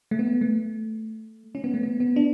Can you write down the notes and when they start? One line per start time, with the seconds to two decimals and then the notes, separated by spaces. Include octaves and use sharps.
0.11 A3
0.19 B3
0.41 A3
1.55 C#4
1.64 B3
1.74 A3
1.83 B3
2.00 B3
2.16 D4